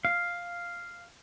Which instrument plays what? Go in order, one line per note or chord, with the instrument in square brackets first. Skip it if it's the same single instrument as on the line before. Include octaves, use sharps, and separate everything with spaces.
[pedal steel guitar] F5